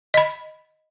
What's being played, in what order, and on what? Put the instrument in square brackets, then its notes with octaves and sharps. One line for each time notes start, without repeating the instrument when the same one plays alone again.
[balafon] D#5 B5